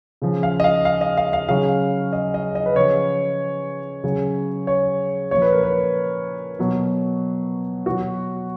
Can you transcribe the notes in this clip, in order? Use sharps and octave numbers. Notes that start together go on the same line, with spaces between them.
C#3 F3
F5
D#5
F5
F5
D#5
F5
F5
C#3 F#3 F5
D#5
D#5
D#5
B4
C#3 F3 C#5
C#3 F#3
C#5
A#2 F3 C#5
B4
A#4
B4
B2 F#3
B2 F#3 F#4